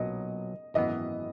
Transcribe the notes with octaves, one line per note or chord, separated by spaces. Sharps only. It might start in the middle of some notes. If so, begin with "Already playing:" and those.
Already playing: B1 A#2 F#3 D#5
G#1 F#2 E3 B3 D#5